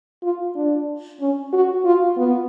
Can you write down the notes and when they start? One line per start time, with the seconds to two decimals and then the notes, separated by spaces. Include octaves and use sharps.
0.23 F4
0.55 D4
1.20 C#4
1.53 F#4
1.85 F4
2.17 B3